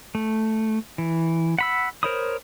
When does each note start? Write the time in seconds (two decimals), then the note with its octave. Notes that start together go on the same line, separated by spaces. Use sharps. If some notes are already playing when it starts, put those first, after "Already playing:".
0.15 A3
0.98 E3
1.59 F#5 B5 E6
2.03 A#4 C5 C#5 B5 D#6